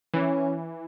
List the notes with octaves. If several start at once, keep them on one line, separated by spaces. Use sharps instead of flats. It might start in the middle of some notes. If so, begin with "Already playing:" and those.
E3 C#4